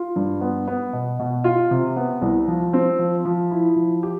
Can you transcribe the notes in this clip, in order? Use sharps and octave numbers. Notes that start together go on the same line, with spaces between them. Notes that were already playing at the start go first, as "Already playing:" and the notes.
Already playing: F4
G2
B3
B3
B2
B2
F4
C3
B3
C2
F3
C4
F3
F3
E4
F3
G4